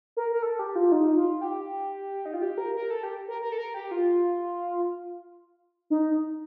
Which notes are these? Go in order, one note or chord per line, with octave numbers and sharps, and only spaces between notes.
A#4
A#4
A4
G4
F4
D#4
F4
G4
D#4
F4
G4
A#4
A#4
A4
G4
A#4
A#4
A4
A#4
G4
F4
D#4